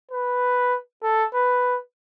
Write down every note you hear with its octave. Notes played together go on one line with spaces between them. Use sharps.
B4
A4
B4